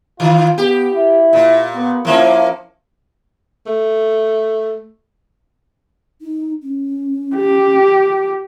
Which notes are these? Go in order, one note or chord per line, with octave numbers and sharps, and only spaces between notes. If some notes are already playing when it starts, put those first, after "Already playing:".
D#3 F4
B3 G4
E4
A#2
B3
F3 A#3 C#4 E4
A3
D#4
C#4
G4